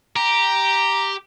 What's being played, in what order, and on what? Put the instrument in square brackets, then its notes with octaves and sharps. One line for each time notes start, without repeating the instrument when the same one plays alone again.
[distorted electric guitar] G4 [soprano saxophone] A#5